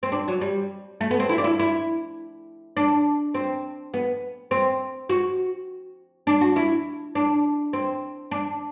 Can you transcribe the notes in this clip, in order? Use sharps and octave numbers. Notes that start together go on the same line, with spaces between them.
C4
D4
F#3
G3
A3
B3
C4
E4
D4
E4
E4
D4
C4
B3
C4
F#4
D4
F#4
E4
D4
C4
D4